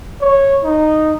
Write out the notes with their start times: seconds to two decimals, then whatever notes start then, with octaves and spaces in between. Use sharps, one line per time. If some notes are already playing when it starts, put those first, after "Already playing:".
0.21 C#5
0.63 D#4